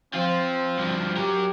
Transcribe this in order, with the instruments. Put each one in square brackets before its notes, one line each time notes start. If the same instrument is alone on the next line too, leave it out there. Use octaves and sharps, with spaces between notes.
[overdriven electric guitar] F3 F4 [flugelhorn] C4
[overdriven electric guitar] G2 F3
[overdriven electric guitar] F#3 A#4 [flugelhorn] G4